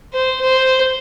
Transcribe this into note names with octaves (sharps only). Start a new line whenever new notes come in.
C5
C5